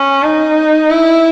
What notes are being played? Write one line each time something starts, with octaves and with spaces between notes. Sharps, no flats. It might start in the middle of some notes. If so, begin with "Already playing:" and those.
Already playing: C#4
D#4
E4